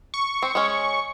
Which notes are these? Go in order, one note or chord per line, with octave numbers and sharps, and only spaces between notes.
C#6
C4
G#3 C#4